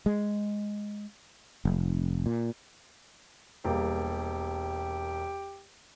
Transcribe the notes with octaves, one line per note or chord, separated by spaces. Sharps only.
G#3
F1
A#2
E1 G3 A#3 G4